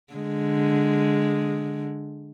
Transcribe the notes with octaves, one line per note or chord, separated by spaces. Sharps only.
D3 G#3